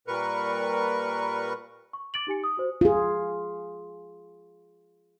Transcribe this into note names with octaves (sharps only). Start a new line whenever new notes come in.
A#2 G3 A#4 B4 C#6
C#6
D6 A6 D7 F#7
D#4 G4 G#5 C#7
D#6
F#4 C5
F4 G#4